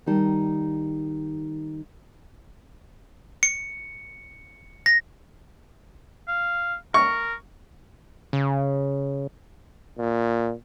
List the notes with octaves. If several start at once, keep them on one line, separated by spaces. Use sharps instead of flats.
D#3 G3 D#4 A5
C#7
A#6
F5
A#4 C#6
C#3
A#2